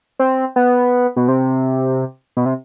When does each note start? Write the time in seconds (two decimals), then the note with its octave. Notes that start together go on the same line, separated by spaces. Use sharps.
0.19 C4
0.56 B3
1.17 B2
1.28 C3
2.37 B2
2.46 C3